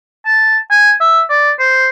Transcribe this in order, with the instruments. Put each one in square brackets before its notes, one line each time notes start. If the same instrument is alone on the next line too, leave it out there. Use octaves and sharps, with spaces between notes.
[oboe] A5
G#5
E5
D5
C5